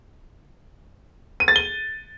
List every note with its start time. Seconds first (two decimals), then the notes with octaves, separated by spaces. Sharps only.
1.40 D#7
1.48 A6
1.56 G7